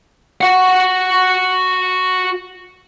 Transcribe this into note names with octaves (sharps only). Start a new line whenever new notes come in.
F#4 F#5